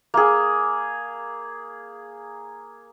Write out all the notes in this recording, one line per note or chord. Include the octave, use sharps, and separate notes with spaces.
A#3 G#4